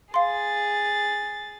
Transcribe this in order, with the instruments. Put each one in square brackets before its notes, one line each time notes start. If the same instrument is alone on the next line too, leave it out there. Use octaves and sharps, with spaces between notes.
[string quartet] G#4 A6 [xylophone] F5 C6